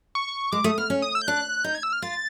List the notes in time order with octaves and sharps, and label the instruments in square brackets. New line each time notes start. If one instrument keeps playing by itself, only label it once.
[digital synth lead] C#6
[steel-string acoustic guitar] G#3 [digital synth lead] D6
[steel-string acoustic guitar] A3 [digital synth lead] D#6
[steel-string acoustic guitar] B3 [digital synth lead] F6
[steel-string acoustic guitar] C#4
[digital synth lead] D#6
E6
G6
[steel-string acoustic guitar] D4 [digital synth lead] F#6
[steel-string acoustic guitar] D#4 [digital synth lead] G6
[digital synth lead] G#6
E6
F6
[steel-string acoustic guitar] F4 [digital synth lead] A6